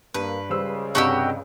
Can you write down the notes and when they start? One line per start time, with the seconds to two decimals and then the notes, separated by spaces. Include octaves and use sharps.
0.14 G2 A#3 B4
0.50 C#2 C#3 G3 C5 E6
0.95 G2 C3 F#4 G4 D#5 E6